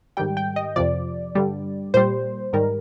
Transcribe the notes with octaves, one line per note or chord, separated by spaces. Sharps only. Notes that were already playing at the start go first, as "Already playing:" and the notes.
G#2 D#3 G3 G5
G5
D#5
F2 C3 F3 D5
G2 D3 G3
A#2 G3 C5
G#2 D#3 G3 A#4